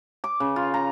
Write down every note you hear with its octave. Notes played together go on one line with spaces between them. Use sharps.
D6
C#3
F4
A#5